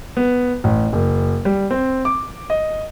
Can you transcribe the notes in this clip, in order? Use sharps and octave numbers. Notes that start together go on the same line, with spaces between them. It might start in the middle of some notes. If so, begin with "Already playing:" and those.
B3
A1
F#1
G3
C4
D6
D#5